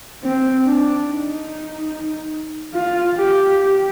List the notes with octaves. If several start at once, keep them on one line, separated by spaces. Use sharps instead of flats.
C4
D4
D#4
F4
G4
G4